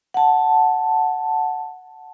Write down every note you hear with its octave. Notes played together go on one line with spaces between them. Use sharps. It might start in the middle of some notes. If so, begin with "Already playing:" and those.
F#5 A5